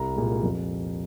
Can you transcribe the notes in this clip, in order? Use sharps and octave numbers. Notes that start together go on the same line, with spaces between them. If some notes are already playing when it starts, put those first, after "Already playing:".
Already playing: C2 A#5
A#2 G#3
F2